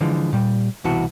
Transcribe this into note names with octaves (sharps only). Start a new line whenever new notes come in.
D3 E3 F3 G#3
A#2 G3
C2 B2 E3 E4 F#4 A5